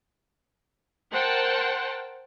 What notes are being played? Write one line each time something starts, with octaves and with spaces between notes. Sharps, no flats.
A#4 C5 F#5 G5 A5